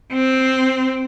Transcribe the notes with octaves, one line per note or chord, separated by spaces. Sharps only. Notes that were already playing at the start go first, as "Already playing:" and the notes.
C4